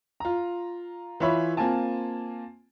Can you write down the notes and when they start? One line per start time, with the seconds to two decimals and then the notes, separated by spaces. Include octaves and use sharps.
0.20 F4 A#5
1.20 E3 F4 C#5 E5 B5
1.57 A#3 C4 F4 G#5 A5